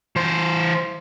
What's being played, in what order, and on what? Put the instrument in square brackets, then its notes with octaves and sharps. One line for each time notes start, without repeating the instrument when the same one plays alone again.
[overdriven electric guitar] E3 C5